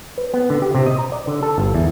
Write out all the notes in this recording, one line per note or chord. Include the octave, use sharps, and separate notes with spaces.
B4
B3
D3
G4
C3
D#5
A#5
D5
D3
A4
G1
E2